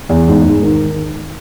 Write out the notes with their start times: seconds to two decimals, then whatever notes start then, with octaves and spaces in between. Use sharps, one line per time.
0.10 E2
0.28 G#2
0.45 G#2
0.63 D#3